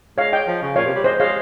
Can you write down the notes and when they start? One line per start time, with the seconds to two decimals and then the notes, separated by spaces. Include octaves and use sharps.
0.18 G#3 C#5 F5
0.33 D#5 G5
0.48 F3
0.62 C#3
0.76 A#2 C#5 F5
0.85 C3
0.95 G3
1.04 G#3 C5 D#5
1.19 G#3 C#5 F5